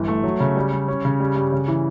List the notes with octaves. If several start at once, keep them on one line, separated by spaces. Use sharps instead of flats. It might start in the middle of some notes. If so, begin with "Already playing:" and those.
Already playing: G1 E3
A3
F#3
C#3
G3
G3
C#4
C#3
G3
G2
C#3
E3